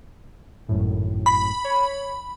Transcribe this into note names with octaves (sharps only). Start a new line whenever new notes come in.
G#1 F#2 A2
B5
C#5